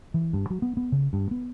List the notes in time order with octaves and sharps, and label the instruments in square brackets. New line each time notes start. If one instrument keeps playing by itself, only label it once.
[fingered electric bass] E3
G2
F#3
B3
B3
C#3
G2
B3